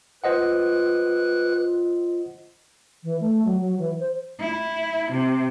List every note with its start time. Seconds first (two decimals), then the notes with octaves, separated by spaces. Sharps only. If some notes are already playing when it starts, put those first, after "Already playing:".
0.24 F4 B4 C5 D#5 F#5 F#6
3.04 E3
3.21 A3
3.45 F#3
3.61 F#3
3.79 E3
3.99 C5
4.40 E4
5.12 C3